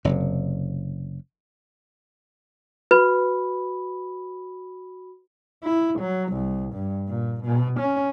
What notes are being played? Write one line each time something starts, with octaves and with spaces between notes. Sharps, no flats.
F#1 C3
F#4 B4 B5
E4
F#3
C2
G2
A#2
B2
C#4